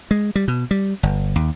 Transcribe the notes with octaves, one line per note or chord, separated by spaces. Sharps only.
G#3
G3
B2
G3
G1
D#2